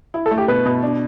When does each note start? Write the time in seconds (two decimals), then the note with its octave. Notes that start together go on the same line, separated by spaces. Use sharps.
0.14 E4
0.26 A4
0.31 A3
0.38 G4
0.48 B2 B4
0.66 B2
0.83 D4